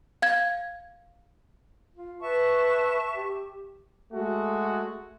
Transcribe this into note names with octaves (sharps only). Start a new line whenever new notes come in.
F5 G#6
F4
B4 E5 A5 C#6
G4
G#3 A3 F#4